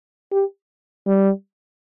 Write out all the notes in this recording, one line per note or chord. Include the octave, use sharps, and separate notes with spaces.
G4
G3